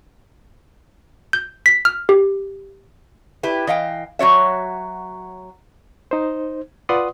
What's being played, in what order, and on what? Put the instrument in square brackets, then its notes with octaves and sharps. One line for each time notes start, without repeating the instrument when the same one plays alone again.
[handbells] G6
B6
F6
G4
[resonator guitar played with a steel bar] E4 G4 B4
E3 D#5 F5 G5
F#3 F#4 C#5 E5
[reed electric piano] D#4 C5
F4 B4 D5 F#5 C6 D#6